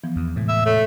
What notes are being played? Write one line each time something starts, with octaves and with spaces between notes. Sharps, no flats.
E3 F3 B3
E2
A2 C3 E3 G#3
E5
A3 C#5